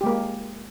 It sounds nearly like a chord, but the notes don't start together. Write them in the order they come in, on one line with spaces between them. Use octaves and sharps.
G4 G#3 A#3